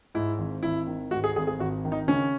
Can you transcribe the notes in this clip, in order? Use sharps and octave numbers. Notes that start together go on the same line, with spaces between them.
G#2 E4
G#1
G#1 E4
D#3
G#2 F#4
G#4
G#1 G#4
G#4
G#1 F#4
D#3
D#4
C#3 C#4